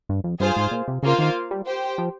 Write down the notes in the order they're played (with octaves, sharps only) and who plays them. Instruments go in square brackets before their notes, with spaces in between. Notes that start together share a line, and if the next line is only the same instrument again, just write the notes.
[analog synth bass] G2
F2
[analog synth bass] G2 [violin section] F4 G#4 C5 F5
[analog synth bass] G#2
A#2
C3
[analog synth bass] C#3 [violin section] A#3 F4 C5 F5
[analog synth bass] D#3
G3
[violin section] G4 C5 G5
[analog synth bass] F3